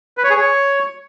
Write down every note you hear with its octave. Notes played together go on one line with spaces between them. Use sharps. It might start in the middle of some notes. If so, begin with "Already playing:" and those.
B4
C#5
G#4
C#5